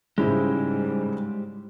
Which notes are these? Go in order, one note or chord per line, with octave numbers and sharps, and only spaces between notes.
G#2 C#3 G3 G#3 E4 G4 C5